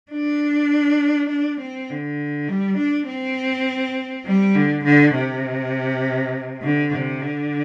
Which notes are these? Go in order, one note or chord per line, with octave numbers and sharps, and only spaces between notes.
D4
D4
C4
D3
G3
D4
C4
G3
D3
D3
C3
D3
C3
D3